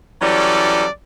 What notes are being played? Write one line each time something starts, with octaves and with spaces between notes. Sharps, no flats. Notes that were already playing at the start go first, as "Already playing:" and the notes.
E3 F#3 G3 C#4 A4 D5